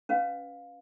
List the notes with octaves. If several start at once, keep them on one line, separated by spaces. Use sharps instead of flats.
C#4 B4 F5